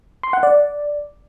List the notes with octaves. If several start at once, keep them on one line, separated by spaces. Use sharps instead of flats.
C6
F#5
D5